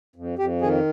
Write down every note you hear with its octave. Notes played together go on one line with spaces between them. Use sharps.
F2
F2 G4
D#3 G#4